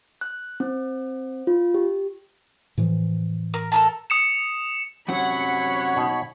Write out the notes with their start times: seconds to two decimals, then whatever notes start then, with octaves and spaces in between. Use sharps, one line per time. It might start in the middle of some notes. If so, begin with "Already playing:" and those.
0.21 F#6
0.60 C4
1.47 F4
1.74 G4
2.78 A2 E3 F3
3.54 A#4
3.72 A4 A#4 A5
4.10 D#6 C#7 E7
5.08 F#2 C3 F#3 C#5 F#5 B5
5.96 B2 D#4